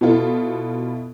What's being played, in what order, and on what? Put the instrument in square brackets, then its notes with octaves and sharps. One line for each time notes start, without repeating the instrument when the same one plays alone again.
[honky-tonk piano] B2 B3 E4 F4 A4